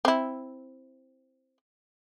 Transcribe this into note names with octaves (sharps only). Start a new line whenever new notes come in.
C4 E4